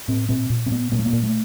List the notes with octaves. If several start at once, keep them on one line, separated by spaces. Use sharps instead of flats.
A2 C4
A#2 C4
A#2
C4
A#2 B3
A#2 A#3
A3
A#3
A#2
A3